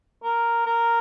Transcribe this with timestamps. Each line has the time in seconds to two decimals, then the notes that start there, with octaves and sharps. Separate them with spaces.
0.24 A#4
0.66 A#4